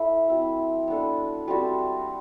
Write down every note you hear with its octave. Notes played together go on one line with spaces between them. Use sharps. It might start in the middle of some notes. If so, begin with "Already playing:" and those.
Already playing: E4 A4 E5
F#3 C4 E4 A4
B3 D4 A4
G3 C4 F#4 A4